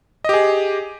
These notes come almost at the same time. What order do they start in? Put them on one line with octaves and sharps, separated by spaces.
D#5 G4 G#4